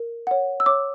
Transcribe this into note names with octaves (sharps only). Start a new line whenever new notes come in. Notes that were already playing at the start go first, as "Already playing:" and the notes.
Already playing: A#4
C#5 F#5
E6
C#5 D6